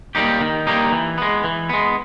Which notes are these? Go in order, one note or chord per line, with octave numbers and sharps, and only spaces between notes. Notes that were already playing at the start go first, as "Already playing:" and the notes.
G3 A#3 D#4 G4
D#3
G3 A#3 D#4 G4
E3
G#3 B3
E3
G#3 B3